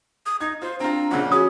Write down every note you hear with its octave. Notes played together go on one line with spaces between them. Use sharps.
D#6
D#4 G#6
F4 C5
C4 D4 F4 A#5
F2 A#2 C#3 F#5
C#4 F#4 G#4 D#6